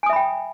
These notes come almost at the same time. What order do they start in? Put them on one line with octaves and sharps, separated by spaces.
G#5 D#6 E5 B5 G5